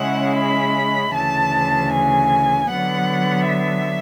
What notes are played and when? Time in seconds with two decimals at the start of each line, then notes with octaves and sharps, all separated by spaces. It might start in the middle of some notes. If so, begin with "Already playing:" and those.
Already playing: C#3 G#3 C#4 E4 F#5
0.36 B5
1.14 D2 C#3 E3 A5
1.92 G#5
2.70 D3 F#3 B3 F#5
3.49 E5